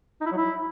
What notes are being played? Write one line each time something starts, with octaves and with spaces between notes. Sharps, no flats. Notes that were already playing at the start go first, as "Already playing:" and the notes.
D#4
E4
F#3
E4